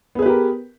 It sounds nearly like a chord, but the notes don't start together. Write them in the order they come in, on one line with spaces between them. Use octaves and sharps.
B3 G#4 B4 G4 A#4